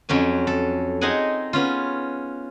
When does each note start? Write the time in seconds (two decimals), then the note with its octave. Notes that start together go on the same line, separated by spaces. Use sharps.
0.09 F2 F#3 C#4 G#5
0.47 A4
1.01 C4 D#4 G#4 D#5 F#5 G#5
1.53 B3 C#4 F4